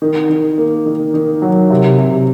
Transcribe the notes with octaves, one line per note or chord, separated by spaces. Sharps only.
D#3
D#3
A#3
D#3
D#3
F#3
C3
C3